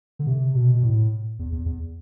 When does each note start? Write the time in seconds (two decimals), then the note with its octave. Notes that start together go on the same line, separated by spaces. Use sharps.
0.19 D3
0.27 C3
0.55 B2
0.74 B2
0.83 A2
1.39 E2
1.52 E2
1.66 E2